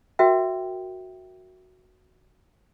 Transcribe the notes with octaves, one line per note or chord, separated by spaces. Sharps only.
F#4 A#4 E5 G5